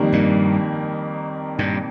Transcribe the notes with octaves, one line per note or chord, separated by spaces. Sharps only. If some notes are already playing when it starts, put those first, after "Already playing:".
Already playing: F2 D#3 G3 A#3
G2 A#2
G2 A#2